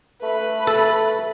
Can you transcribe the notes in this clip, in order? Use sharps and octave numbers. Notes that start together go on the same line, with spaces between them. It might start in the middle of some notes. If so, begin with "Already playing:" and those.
A3 B4 B5
A4